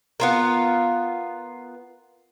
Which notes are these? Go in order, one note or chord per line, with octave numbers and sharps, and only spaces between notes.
B3 F4 A#4